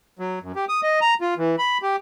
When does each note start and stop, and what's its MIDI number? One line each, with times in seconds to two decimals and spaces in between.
0.19 0.39 54
0.43 0.52 42
0.55 0.65 67
0.69 0.81 87
0.83 1.00 75
1.01 1.14 82
1.21 1.34 65
1.38 1.56 52
1.58 1.78 83
1.82 1.96 67